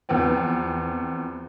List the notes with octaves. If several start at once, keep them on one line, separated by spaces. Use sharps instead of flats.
E2 F3 B3 C4